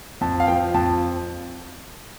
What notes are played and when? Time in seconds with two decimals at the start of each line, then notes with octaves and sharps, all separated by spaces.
0.21 F2 A5
0.40 F5
0.47 F3 G5
0.74 F2 A5